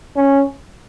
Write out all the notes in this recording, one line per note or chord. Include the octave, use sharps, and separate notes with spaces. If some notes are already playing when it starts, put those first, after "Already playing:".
C#4